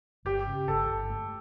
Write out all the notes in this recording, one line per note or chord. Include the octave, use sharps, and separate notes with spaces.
G1 G4
C#3
G1 A4
G1
A3